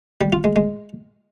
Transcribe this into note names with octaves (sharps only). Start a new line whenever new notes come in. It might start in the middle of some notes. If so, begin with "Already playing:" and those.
G3
F4
G#3
G#3